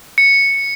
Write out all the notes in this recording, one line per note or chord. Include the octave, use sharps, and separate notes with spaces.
C#7